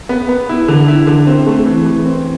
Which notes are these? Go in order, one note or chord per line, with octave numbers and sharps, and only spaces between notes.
B3
B3
E4
D3
E4
D3
C4
A3
E3
E3
C4